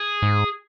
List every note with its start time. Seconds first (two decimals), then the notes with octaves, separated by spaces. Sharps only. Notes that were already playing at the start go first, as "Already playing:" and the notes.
Already playing: G#4
0.22 G#2